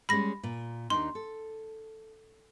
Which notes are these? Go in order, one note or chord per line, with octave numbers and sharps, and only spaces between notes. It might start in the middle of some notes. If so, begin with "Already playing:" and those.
G3 G#3 C#4 B5 A#6
A#2
D#2 D4 D#4 C6
A4